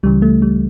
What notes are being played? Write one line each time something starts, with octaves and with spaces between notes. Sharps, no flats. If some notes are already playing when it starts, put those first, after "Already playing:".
C#2 C#3 E3 G3
A3
G3